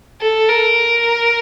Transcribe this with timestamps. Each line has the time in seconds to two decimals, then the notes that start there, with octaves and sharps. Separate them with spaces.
0.21 A4
0.49 A#4